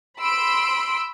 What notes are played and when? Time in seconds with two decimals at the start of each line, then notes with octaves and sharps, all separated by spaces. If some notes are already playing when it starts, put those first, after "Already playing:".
0.20 B5 C6 E6 D7